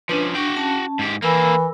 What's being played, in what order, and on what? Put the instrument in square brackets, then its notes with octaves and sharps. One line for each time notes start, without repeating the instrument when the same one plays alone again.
[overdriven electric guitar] F3 C#4 [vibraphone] D4 B4
[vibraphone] D4 C#6 [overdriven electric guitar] F#4 G5
[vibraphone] C#4 A5
[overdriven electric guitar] G#2 G4
[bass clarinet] E3 [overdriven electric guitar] A#3 A4 [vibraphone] A#4 B5 E6